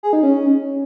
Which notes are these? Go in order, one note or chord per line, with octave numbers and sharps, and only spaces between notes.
G#4
D#4
C#4